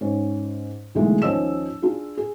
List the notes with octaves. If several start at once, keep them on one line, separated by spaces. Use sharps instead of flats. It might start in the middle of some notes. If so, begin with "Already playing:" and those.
G#2 C#4
E1 B1 D3 E3 G#3 A3
D#2 F3 C#4 D#5 E6 E7
D4 F4 G#4
G#4